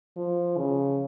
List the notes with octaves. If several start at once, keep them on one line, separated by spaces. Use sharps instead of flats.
F3
C#3